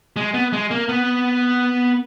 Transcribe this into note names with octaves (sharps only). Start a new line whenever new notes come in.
G#3
B3
G#3
A#3
B3